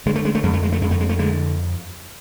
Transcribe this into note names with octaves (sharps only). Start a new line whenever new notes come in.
D3 G#3
A3
G#3
A3
F2 G#3
A3
G#3
A3
F2 G#3
A3
G#3
A3
D3 G#3